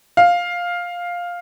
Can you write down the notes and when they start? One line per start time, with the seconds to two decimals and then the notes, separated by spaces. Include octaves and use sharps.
0.17 F5